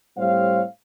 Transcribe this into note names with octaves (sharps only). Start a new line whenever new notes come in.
A2 G3 C4 C5 C#5 F5